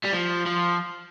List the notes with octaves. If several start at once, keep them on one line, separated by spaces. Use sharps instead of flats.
G3
F3
F3